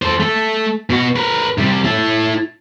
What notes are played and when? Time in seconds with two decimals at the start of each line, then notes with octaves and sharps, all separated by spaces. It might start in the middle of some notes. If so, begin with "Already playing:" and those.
0.02 A4 C5
0.20 A3 A4
0.90 B2 F#4
1.16 A#4 B4
1.58 C3 G3
1.85 E4 A4